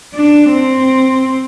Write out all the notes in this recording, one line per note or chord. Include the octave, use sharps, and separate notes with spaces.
D4
C4